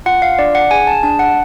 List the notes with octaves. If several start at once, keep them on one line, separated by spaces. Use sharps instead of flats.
F4 F#5
F5
D4 D5
F#5
G#4 G#5
A5
D4 A5
F#5